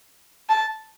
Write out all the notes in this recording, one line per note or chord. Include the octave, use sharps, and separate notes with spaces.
A5